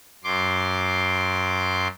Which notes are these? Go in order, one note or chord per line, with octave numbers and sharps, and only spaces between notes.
F#2 C6 D6